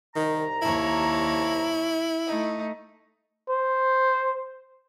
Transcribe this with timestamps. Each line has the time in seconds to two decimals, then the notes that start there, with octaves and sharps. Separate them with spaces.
0.16 C2 D#3 A#5
0.62 D#2 E4 C#5 A5
2.26 A3 D#4
3.49 C5